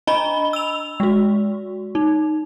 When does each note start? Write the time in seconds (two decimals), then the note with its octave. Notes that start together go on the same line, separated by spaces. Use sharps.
0.07 D4 D#5 A#5 B5 G7
0.53 E6 F7
1.00 G#3 F#4
1.95 D#4